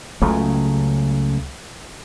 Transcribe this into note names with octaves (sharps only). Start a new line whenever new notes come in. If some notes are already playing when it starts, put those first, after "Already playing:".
C#2 C#3 F#3 A3